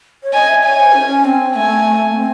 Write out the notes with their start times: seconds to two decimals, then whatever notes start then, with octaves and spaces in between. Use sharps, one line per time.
0.23 C#5
0.33 D#5 G#5
0.49 E5
0.64 C#5 G#5
0.80 C5
0.95 C#4
1.25 C4
1.56 A3 G#5
2.16 C4